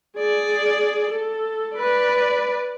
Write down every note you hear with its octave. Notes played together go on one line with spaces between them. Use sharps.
G#4 D5
A4
B4 D5